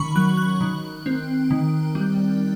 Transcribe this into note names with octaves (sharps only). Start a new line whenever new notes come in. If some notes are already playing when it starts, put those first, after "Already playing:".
Already playing: D#3 C#4 B5 C#6
F#3 F#6
F#6
D#3
C4
D#3
G3